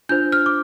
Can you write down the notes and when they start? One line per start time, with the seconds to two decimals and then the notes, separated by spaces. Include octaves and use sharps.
0.09 D4 F4 C5 G6
0.32 F6
0.46 D6